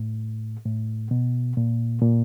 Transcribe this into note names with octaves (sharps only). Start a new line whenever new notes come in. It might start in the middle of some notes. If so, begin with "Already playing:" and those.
Already playing: A2
A2
B2
A#2
A#2